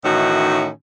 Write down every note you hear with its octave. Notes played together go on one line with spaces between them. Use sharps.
A2 D#3 E3 C#4 D#4 F#4